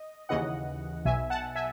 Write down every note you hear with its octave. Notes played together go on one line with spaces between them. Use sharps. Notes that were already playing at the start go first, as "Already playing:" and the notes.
Already playing: D#5
D#2 C#3 E3 D#5 F#5
B1 B2 E5 G#5
F#5 A5
E5 G#5